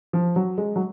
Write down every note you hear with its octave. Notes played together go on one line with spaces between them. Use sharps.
F3
F#3
G#3
F#3